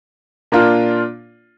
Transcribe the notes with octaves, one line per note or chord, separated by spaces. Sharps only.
A#2 A#3 D4 F4